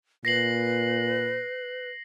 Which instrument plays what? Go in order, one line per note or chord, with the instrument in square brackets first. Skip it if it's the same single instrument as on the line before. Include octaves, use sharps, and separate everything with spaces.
[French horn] A#2 [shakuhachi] B4 [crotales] A#6 C7 F#7